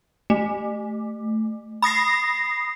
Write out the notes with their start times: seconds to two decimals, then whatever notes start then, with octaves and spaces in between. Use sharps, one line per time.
0.30 A3
1.82 B5 D#6 A#6 C7